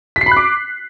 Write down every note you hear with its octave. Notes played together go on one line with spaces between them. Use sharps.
B6
C7
B5
F#6
D6